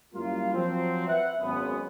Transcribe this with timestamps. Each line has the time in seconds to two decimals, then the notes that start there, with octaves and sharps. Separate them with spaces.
0.14 F#2 G3 A#3 E4 F4
0.53 F3 F#3 C4
1.08 B4 E5 F#5
1.40 G#1 C#2 F#2 B3